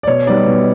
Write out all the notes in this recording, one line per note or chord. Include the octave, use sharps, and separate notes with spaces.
D5
B2 C#5
G3 B3 D#4 D5
B2